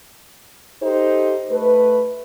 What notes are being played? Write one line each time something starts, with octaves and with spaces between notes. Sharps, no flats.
D#4 G4 A4 C5
A3 B4